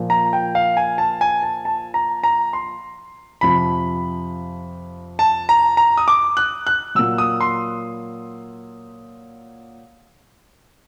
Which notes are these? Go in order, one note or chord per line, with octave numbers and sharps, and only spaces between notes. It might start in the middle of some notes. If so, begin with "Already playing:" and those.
Already playing: A#2 F3
A#5
G5
F5
G#5
A5
G#5
A5
A5
A#5
A#5
C6
F2 C3 F3 B5
A5
A#5
A#5
D#6
D6
F#6
F#6
A#2 F#3 E6
D#6
C6